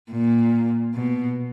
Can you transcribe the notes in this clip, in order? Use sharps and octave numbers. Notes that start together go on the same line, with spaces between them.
A#2
B2